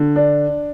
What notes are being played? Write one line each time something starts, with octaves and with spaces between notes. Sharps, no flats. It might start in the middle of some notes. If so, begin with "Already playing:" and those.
Already playing: D3
D4